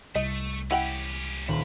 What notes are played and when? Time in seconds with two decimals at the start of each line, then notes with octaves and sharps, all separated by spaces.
0.15 C2 A3 D#5
0.71 C#4 E4 G4 F#5 G5
1.48 D#1 A3 B5